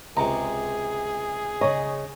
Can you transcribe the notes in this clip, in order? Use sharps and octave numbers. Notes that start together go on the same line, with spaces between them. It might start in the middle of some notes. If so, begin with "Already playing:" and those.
C#2 C3 G#4 A#5
C#3 C#5 D#5